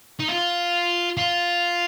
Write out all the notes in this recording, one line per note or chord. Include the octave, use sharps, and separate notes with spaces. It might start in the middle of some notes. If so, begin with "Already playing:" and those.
D#4
F4
F4